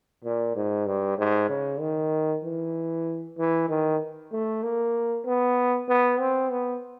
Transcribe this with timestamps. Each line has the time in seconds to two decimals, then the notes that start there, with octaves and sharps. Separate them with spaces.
0.24 A#2
0.56 G#2
0.87 G2
1.18 G#2
1.50 C#3
1.80 D#3
2.44 E3
3.38 E3
3.69 D#3
4.33 A3
4.64 A#3
5.26 B3
5.89 B3
6.20 C4
6.51 B3